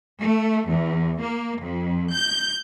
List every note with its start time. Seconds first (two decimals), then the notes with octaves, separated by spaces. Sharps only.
0.21 A3
0.68 E2
1.22 A#3
1.60 F2
2.12 G6